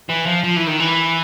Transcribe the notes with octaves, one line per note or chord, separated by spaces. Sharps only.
E3
F3
F3
E3
D#3
E3